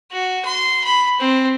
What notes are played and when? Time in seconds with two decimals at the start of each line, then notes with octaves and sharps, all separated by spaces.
0.12 F#4
0.45 C6
0.84 B5
1.19 C4